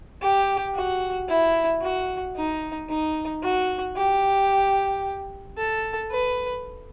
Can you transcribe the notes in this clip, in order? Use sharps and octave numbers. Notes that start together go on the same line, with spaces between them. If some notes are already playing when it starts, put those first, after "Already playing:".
G4
F#4
E4
F#4
D#4
D#4
F#4
G4
A4
B4